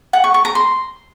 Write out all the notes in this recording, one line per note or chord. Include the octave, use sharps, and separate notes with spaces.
F#5
C#6
C#6
A#5
C6